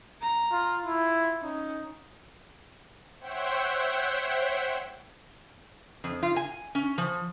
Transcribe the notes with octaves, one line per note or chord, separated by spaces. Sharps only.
A#5
F4
E4 F4
C#4 D#4
C5 C#5 E5 F#5 G5
F2
F4
G#5
C#4
F3